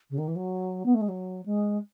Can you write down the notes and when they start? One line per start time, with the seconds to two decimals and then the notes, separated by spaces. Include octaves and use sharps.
0.10 C#3
0.18 D#3
0.28 E3
0.36 F#3
0.86 B3
0.94 A3
1.01 G#3
1.08 F#3
1.45 G#3